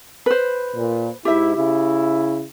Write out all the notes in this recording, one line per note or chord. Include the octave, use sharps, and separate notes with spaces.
B4 C5
A#2
G#2 E4 G4 E5
C#3 E4